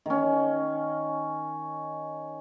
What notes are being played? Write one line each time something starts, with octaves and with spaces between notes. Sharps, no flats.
D#3 C#4